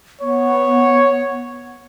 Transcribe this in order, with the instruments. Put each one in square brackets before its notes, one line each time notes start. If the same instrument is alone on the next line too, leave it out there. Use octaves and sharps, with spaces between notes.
[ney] B3 [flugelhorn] C#5